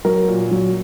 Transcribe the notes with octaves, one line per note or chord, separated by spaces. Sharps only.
F#3 A#4
A#2
F#3